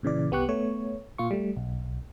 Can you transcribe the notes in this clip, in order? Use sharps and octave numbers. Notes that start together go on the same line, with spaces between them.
A#2 C#3 E3 D5
C2 B3 G4 C#6 F#6
A3 B3 C#5
A#2 F4 C#6
G3 A3
B1